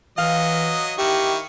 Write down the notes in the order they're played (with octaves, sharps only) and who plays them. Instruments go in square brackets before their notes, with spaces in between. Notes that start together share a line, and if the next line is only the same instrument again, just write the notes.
[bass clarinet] E3 [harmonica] F#3 D#5 [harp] F5
[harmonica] D#3 E4 C#6 [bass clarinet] G4